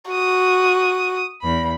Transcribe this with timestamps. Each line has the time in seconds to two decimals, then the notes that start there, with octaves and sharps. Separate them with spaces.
0.11 F#4 D#6
1.41 E2 B5